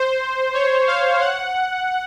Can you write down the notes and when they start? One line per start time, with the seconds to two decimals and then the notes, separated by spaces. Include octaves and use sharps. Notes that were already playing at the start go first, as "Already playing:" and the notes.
Already playing: C5
0.54 C#5
0.88 F5
1.21 F#5